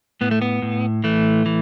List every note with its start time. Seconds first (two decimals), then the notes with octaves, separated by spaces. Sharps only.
0.21 A2 B3
0.31 A3
0.42 B3
0.62 A2
1.04 E3 A3
1.46 E3